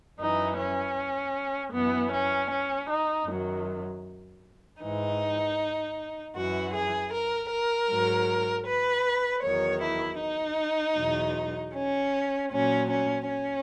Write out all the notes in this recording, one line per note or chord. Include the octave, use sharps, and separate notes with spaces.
F#2 E3 D#4
C#4
F#2 E3 B3
C#4
C#4
D#4
F#2 D#3 F#3
G#2 E3 D#4
F#2 E3 F#4
G#4
A#4
A#4
G#2 F#3
B4
E2 D#3 F#3 C#5
E4
D#4
E2 B2 F#3
C#4
A#2 F#3 C#4
C#4
C#4